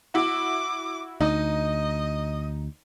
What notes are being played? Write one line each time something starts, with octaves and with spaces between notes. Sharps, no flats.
E4 F#4 D6
D2 D#4 D#5